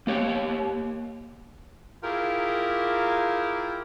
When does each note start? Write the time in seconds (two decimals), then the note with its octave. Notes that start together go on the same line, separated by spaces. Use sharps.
0.07 A#3 G4 C#5
2.03 E4 F4 G4 G#4 A#4